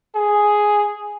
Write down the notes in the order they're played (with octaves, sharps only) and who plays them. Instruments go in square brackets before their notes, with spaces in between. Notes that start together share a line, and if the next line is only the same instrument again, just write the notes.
[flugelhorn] G#4